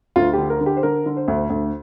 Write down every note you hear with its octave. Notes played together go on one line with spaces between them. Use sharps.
D2 F4
D3 G4
A#4
D3
G4
C5
D3 A#4
D3
C5
D2
D2